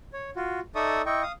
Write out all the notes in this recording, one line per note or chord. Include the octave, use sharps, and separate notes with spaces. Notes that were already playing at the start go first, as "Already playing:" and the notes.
C#5
F4 F#4
D#4 A4 D5 E5 C#6 D#6
E4 D#5 G5 C#6
F5 D#6